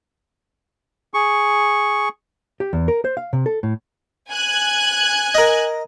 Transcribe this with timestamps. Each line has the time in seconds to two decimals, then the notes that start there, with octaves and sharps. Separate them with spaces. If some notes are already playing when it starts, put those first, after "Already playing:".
1.14 G#4 C#6
2.60 G4
2.73 E2
2.88 A#4
3.05 C5
3.17 F5
3.33 C3
3.46 A4
3.63 A2
4.31 G#5 F#6 G#6
5.35 A#4 D#5